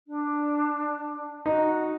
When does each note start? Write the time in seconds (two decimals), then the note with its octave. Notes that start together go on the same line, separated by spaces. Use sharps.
0.06 D4
1.46 D#4 F#4